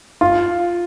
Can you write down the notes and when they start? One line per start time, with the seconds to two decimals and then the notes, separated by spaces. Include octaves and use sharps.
0.21 F4